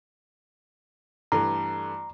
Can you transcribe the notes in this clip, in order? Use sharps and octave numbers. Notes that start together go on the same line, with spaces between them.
G2 E3 A3 A#5